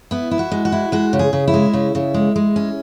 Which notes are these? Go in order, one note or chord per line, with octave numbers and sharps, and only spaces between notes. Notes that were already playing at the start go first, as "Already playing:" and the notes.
B3 E4
E4
F#4
G#3
F#4
E4
G#3 F#4
C#3
G#4
C#3
E4
G#3
C#3
C#3
G#3
G#3
C#4